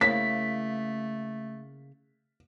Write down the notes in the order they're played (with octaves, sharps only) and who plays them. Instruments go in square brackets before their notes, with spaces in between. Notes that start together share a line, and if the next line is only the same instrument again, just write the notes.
[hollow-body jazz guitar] C#3 A#3 E4 [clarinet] A3 [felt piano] B6